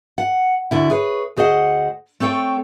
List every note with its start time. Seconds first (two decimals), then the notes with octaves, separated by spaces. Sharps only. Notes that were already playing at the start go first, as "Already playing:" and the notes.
0.18 F#5
0.71 D2 D3 E4
0.90 G#4 B4 C#5
1.37 D2 G#4 C5 D#5 F#5
2.20 A3 C4 A4 C#5 G5